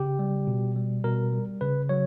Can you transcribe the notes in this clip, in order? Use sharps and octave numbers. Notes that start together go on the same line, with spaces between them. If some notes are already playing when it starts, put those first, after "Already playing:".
Already playing: C#3 G4
G3
B2
G3
B2 A#4
G3
C#3 B4
F#3 C#5